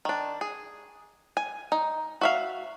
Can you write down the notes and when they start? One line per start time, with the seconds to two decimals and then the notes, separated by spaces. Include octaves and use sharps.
0.05 D#3 D4
0.41 G#4
1.37 G#5
1.72 D#4
2.21 F#4 E5 F5